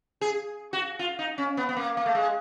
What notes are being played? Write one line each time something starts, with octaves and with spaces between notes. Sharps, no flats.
G#4
F#4
F4
D#4
C#4
B3
B3
A#3
A#3
A3
G#3